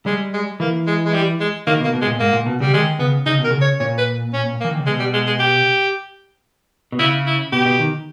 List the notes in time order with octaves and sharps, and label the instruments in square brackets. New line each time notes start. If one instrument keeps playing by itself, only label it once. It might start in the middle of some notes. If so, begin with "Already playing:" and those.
[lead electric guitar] G3 [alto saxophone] G#3
[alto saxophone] G#3
[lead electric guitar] E3 [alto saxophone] A#3
[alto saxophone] G#3
G#3
G3
G#3
[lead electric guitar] D#3 [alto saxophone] A#3
[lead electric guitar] B2 [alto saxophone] A#3
[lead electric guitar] B2
[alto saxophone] G#3
[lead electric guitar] A#2
[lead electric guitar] G#2 [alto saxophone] A#3
[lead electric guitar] A#2
B2
[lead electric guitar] C#3 [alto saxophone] G3
[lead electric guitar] D#3 [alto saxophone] G#3
[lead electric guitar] C#3 [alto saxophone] B3
[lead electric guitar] C#3 [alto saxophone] D#4
[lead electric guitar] B2
[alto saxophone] A#4
[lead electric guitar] C#3
[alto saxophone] C#5
[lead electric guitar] A#2 [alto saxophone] C#5
[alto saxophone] B4
C#4
A#3
[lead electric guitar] E3
D#3
C#3
[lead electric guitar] B2 [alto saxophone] G#3
[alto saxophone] G3
G#3
G#3
G4
[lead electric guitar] B2
[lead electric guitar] C#3 [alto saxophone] E4
[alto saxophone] E4
[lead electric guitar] B2 [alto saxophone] G4
[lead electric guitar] B2
D#3